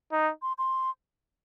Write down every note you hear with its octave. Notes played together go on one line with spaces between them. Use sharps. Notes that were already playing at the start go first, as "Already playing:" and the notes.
D#4
C6
C6